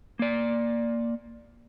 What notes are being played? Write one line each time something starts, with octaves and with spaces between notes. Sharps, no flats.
A#3 D5